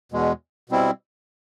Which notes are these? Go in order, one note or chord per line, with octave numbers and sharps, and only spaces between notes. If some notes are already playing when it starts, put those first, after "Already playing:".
E2 B2 G#3
B2 G3 C4 E4